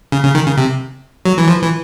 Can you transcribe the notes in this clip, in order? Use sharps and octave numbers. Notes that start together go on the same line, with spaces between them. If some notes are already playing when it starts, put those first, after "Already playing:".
C#3
C#3
D#3
C#3
C3
F#3
E3
F3
E3